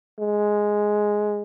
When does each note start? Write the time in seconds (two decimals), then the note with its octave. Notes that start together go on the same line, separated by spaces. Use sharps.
0.19 G#3